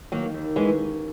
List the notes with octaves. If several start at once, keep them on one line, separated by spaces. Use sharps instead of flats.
D#3 F#3 A#3
D#2
E3 G#3 C#4